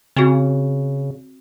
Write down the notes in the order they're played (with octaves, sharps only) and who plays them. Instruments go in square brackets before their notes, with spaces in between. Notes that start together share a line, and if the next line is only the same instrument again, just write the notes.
[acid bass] C#3 [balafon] C4 F#4